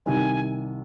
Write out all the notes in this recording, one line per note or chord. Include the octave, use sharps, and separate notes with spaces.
C2 C3 D#3 G3 G#5